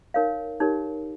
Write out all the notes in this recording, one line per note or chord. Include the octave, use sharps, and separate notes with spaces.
D#4 A#4 C#5 F5
D#4 G4 A#4 C#5